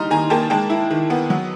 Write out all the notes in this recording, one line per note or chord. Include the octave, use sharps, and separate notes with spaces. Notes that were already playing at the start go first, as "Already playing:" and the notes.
Already playing: G3 D#4 A#5 C6 D#6 F6
D#3 G#5 A#5
A#3 G5 A5
G#3 G5 A5
E4
D#3
B3
F#3